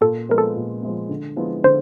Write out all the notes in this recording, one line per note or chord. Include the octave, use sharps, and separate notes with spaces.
A#2 A4
F3 G#3 B3 A#4
A4
A#2
F3 G#3 B3
D3
F3 G#3 B3 E4
D3 C5